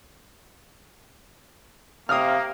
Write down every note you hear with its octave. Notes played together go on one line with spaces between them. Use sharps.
C3 A#3 F5 D#6 F6